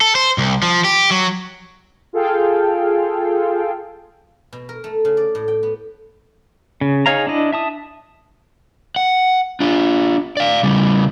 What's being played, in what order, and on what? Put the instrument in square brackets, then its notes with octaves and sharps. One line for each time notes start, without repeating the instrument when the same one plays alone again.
[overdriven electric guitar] A4
C5
C2
F3
G4
F#3
[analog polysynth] F4 G#4 A4 F5 G5
[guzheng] B2
A#4
A3
C#3
D5
A2
G5
B3
[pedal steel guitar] C#3
D#4 G#4 C#5 F5 A#5
D4 E4 D#5
E5 A5 D#6
[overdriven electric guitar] F#5
D4 F4
D5 F5
C#3 G3